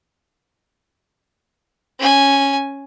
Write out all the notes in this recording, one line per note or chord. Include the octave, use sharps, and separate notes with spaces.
C#4 G#5